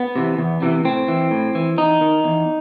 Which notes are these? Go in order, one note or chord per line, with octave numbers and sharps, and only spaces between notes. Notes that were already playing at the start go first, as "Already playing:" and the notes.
Already playing: B3
C3 E3
E2
C3 E3
A2 C4
E3
A2
E3
E2 D#4
D#3
E2